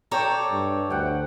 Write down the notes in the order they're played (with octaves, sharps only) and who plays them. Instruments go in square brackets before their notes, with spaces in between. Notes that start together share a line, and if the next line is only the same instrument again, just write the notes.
[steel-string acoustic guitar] A4 C#5 A#5 [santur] D5 G5 C#6
[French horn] G2
[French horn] D2 [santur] F#5 G5